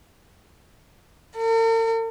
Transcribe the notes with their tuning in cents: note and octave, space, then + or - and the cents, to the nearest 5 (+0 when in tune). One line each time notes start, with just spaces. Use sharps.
A#4 -45